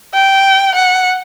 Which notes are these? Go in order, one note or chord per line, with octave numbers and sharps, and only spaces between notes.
G5
F#5